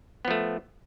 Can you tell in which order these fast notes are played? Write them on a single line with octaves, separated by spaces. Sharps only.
B3 F3 A3